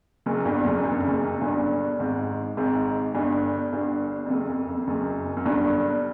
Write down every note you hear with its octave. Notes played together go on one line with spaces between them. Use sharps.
F#1 F#2
G1 G2
F#1 F#2
G2
F#2
F2
F#1 F#2
G1 G2
G#1 G#2
G#1 G#2
G1 G2
G1 G2
F2
F#1 F#2
F2
F2
F2
F#1 F#2
F#2
G1 G2